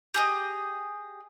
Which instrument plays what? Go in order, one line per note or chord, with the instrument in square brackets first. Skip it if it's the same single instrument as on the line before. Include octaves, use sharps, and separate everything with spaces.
[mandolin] G4 G#4 D#5